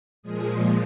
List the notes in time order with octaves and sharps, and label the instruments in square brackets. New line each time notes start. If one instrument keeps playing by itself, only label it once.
[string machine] A#2 F3 G#3 G#4